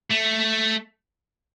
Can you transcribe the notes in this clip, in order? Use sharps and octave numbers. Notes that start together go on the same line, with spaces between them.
A3